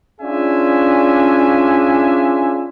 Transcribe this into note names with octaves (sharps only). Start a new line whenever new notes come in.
C#4 D4 F4 G#4 E5 G#5